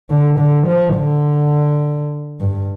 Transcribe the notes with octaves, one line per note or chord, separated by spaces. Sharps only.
D3
D3
F3
D3
G2